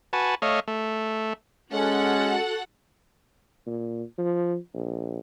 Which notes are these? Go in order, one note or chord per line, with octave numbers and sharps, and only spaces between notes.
F#4 B4 G#5 A5
A3 C#5 D#5 F5
A3
G#3 C#4 F#4 A4 F#5
A#2
F3
A#1